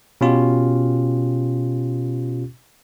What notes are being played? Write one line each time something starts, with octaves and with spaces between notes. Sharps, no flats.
B2 C#4 F4 G4